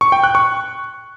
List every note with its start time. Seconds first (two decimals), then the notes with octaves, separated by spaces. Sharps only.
0.01 C#6
0.12 G5
0.24 F#6
0.35 C#6